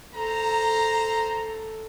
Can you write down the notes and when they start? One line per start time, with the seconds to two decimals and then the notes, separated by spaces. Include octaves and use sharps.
0.14 A4 C5 A#5